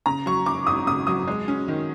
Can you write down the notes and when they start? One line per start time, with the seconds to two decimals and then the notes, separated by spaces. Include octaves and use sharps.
0.06 C#3 A#5
0.26 F#3 C#6
0.46 F#2 D6
0.67 G#1 D#6
0.87 C#3 D#6
1.07 F#3 D#6
1.28 G#3
1.48 C#4
1.68 D#3